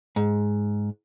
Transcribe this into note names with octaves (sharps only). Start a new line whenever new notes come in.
G#2